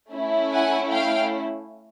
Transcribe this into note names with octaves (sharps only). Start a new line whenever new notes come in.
A3 C#4 E4
F#5 G#5
F5 G5